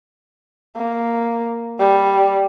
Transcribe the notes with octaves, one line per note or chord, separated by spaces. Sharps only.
A#3
G3